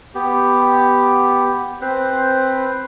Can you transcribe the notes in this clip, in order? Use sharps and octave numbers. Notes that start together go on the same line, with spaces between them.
B3 G4
C4 B4 C5